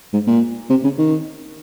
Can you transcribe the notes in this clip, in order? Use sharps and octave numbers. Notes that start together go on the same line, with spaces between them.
G#2
A#2
C3
C#3
D#3